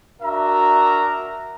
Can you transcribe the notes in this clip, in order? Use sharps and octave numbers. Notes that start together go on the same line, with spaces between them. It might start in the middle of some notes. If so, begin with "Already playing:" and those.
D4 F#4 A#4 E5 A#5